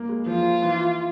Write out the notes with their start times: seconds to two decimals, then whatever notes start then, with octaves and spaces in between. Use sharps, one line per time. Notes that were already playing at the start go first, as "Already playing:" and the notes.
Already playing: A#3
0.09 G#3
0.26 F3 F4
0.62 E3